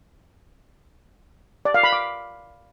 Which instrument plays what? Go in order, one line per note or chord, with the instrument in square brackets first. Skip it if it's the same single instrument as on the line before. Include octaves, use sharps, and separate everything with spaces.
[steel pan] D5
F5
B5
D6